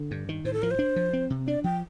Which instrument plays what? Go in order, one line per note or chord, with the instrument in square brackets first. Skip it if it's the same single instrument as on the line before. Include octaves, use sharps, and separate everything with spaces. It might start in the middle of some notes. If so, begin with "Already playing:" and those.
Already playing: [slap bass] D3
G2
D#3
[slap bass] A2 [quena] C5
[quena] A4
[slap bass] F3 [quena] A#4
[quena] C5
[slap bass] D4
F3
C4
C3
[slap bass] D4 [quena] D5
[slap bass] F3 [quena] G5